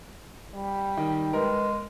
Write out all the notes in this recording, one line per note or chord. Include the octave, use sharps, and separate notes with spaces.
G3
D#3
G#3 A#4 B4